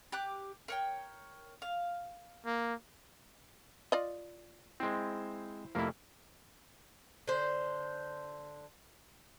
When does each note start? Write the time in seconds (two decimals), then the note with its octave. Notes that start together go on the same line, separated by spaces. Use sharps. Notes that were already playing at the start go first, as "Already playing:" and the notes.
0.12 G4 D6 F#6
0.68 A#4 C#5 G5
1.62 F5
2.46 A#3
3.92 F4 D5 D#5
4.80 G#3 C4 E4 C5
5.75 F2 C3 A3 A#3 E4
7.27 D3 C5